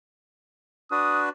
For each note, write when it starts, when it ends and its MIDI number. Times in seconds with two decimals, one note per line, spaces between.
0.91 1.29 62
0.91 1.29 66
0.91 1.29 71
0.91 1.21 87